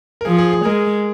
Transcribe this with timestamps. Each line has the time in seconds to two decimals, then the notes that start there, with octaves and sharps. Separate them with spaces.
0.21 A#4
0.25 F3 G#4
0.38 G#4
0.52 G#4
0.65 G#3 A#4